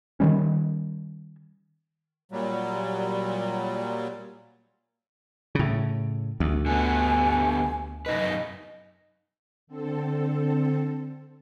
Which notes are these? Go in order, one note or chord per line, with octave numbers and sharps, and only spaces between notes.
D#3 F3 G3 C#4
A#2 F#3 G3
A2 C#3
D2
D3 B3 G#5
F#2 D#4 B4 D#5
D3 C4 A4